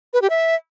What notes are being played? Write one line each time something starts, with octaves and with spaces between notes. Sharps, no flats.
B4
G4
E5